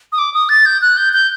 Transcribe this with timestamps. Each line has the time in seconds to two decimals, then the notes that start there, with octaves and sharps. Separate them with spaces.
0.12 D#6
0.18 D6
0.34 D#6
0.49 A6
0.66 G6
0.82 F#6
0.97 G6
1.13 G6